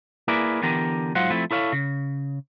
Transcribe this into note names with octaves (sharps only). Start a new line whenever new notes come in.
A#3 E4 G#4 A#4 B4 D5
D3 E3 B3 G4 A#4
G#2 F#3 F4 C5 F5 F#5
F3 A3 C4 E4
E4 A4 C#5 F5
C#3